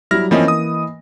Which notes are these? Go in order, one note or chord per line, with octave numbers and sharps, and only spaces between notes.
F#3 G3 E4 F6 A#6
E3 F3 A#3 C4 C#4 D#5
D#6